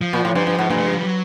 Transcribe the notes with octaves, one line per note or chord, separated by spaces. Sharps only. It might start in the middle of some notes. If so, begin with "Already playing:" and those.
F3
A#2
A2
G2 F3
G2
G#2
G2 A#3
A3
G#3
G3
F#3